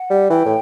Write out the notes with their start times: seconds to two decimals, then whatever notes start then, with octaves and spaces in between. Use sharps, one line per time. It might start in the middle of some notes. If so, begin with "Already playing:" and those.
Already playing: F#5
0.10 G3
0.29 E3 G5
0.45 A2